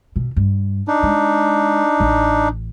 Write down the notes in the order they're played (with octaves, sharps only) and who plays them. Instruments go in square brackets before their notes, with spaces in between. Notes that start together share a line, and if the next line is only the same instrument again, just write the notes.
[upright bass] B2
G2
[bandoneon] D4 D#4
[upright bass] G#3
A1